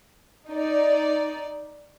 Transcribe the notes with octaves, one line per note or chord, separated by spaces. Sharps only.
D#4 D5